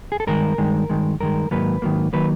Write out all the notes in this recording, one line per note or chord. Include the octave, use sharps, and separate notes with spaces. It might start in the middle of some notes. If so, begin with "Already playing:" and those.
G#4
A4
G2 D#3 G#3 A#4
G2 D#3 G#3
G2 D#3 G#3
G2 D#3 G#3 A#4
G#2 D#3 F#3 A#3 B4
G#2 D#3 F#3 A#3
D#3 F#3 A#3 B4